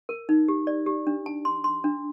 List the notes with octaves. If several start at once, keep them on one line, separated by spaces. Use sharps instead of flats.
A#4
D#4
G4
D5
G4
D4
A5
C6
C6
D4